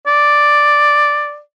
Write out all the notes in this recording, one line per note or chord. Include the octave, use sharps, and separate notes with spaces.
D5